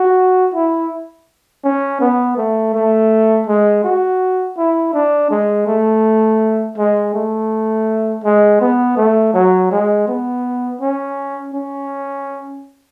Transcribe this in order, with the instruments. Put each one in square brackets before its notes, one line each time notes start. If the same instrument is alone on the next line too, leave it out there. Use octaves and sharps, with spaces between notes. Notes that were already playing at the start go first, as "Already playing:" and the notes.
Already playing: [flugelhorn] F#4
E4
C#4
B3
A3
A3
G#3
F#4
E4
D4
G#3
A3
G#3
A3
G#3
B3
A3
F#3
G#3
B3
C#4
C#4